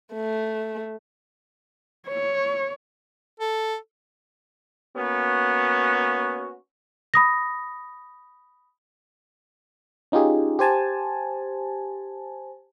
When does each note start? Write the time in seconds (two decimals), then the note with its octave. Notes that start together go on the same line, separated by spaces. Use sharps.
0.13 A3
2.08 C#5
3.40 A4
4.97 A#3 B3 C#4 F#4
7.14 B5 D#6 A#6
10.12 C#4 D#4 F4 G4 G#4
10.59 G4 C5 G#5 A5